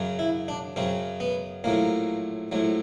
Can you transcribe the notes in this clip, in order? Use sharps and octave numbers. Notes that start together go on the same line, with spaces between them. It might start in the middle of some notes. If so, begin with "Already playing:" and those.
Already playing: F#2 C#3 F#3
E4
D4
F#2 C#3 F#3 C4
B3
A#1 A2 F#3 A#3
A#1 A2 F#3